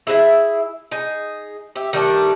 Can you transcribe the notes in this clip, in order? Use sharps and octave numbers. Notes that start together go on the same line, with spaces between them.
E4 G#4 B4 E5
D#4 G#4
G4 E5
D#3 G3 A3 D4